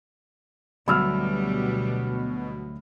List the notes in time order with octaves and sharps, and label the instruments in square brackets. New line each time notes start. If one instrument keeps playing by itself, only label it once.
[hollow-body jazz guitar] D2 F#3 [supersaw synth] B2 [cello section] G3 B3 [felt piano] B5 E6 F6